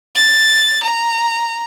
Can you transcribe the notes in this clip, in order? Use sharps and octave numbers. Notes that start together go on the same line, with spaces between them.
A6
A#5